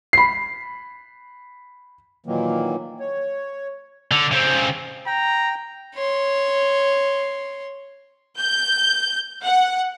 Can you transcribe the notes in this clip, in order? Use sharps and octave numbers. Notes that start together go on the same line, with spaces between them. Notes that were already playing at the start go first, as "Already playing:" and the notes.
B5 C7
A#2 D#3 E3 F#3 A#3
C#5
D3
C#3 C4
G5 A#5
C#5 C6
G6
F#5